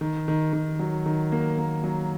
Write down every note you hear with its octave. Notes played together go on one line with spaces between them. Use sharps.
D#3
D#3
D#3
F#3
D#3
A#3
A#3
F#3